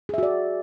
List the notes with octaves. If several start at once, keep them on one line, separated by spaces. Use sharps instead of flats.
F#4 G#4 D5 E5